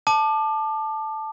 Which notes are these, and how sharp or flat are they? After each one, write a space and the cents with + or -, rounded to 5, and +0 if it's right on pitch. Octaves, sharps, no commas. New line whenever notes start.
A5 -5 D6 +30